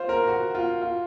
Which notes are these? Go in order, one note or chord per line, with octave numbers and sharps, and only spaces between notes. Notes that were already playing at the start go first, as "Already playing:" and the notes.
Already playing: F4 C5
A#4
F#4
F4
F4